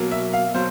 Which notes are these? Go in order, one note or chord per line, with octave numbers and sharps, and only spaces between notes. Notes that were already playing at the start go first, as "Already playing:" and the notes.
Already playing: B2 F#3 A#3
E5
F5
B2 F#3 C5